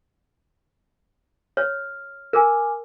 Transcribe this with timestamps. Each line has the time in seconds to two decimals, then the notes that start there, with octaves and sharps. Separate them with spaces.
1.57 C#5 F6
2.33 A#4 G#5 D6 F6